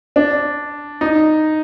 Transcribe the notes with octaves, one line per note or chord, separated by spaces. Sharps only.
D4
D#4